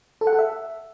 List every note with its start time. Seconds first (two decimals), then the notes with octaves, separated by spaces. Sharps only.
0.21 A4
0.27 F#5
0.33 A4
0.39 E5